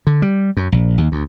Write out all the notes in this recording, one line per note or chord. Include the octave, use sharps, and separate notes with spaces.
D3
G3
F#2
A#1
D#2
D2